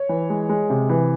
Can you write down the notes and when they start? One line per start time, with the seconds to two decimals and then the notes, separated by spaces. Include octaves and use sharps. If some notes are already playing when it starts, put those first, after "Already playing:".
Already playing: C#5
0.09 E3
0.30 G#3
0.49 G#3
0.70 C3
0.89 E3